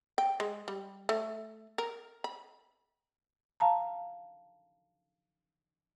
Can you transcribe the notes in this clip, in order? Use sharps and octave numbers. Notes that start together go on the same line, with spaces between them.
G5
G#3
G3
A3
A#4
B5
F5 A5 A#5